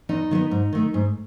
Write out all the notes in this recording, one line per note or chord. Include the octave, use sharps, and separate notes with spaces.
E2 D#4
D#3 G#3 B3
G#2
D#3 A3
G#2